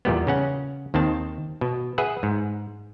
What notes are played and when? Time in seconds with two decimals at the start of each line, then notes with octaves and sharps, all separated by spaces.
0.05 E2 A#2 G3 B3
0.27 C#3 C#4 F#5
0.94 D#2 D#3 C4 A5
1.61 B2
1.98 G#4 B4 E5 F#5
2.23 G#2